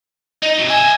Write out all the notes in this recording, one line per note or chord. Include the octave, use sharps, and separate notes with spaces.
D#4 D#5
C3 F#3
D#5 E5 G#5